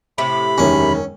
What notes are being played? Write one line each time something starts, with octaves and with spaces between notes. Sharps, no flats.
A2 C3 G4 B5
E1 F#2 D#3 C#4